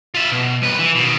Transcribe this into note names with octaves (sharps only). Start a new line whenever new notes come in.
F4 E5
B2
C2 B4
E3
B2 D#3